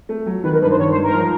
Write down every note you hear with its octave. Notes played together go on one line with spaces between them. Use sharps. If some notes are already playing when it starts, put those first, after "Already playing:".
A3
F#3
D#3 B4
A#4
G2 B4
C5
D#3 C#5
C5
G#2
A#4
F3